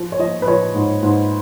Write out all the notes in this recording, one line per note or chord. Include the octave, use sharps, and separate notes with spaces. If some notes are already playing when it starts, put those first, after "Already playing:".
Already playing: F3
C#5
F3 D#5
B4
F3 C#5
G#2
G#2